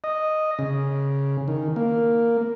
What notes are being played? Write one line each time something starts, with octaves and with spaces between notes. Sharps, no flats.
D#5
C#3
D#3
A#3